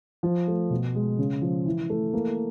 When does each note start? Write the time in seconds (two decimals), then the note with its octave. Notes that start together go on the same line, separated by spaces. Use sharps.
0.23 F3
0.48 A3
0.71 B2
0.95 G#3
1.19 C#3
1.42 F3
1.66 E3
1.90 A3
2.14 A#3